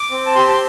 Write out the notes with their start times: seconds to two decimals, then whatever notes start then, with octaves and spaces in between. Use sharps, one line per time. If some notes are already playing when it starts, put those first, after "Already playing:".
Already playing: D6
0.11 C4
0.26 A5
0.35 G4 C6
0.48 A5
0.52 C6